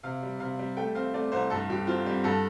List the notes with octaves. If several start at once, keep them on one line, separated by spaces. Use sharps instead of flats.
C3 F5
G3
C3 F5
G3
A3 G5
C4 F5
A3 D5
C2 C5
G2 A4
G2 G4
C4 F4
G3
G2 A4